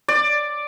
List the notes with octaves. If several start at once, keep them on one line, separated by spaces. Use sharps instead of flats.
D5